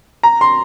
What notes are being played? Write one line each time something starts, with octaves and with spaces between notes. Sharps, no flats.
A#5
C6